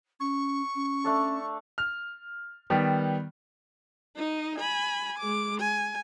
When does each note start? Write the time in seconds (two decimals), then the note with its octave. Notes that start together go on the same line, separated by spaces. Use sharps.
0.20 C#4 C#6
0.75 C#4
1.04 A3 D4 A4
1.78 F6
2.70 D#3 G3 B3
4.16 D#4 D#5
4.58 G#5 B5
5.18 G#3 D6
5.60 G#5